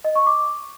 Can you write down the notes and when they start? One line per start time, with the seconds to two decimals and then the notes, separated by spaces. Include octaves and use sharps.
0.04 D#5
0.15 C#6
0.27 D6